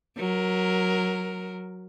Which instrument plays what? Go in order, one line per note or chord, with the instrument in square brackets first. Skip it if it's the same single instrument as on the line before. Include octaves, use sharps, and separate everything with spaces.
[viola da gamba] F#3 A#4